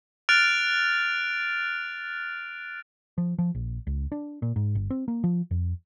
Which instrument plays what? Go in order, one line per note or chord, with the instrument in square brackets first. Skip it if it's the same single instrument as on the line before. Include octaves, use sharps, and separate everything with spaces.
[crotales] F6 F#6 A6 D7 F7
[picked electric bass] F3
F3
A#1
C#2
D4
A#2
G#2
G1
C4
A#3
F3
F2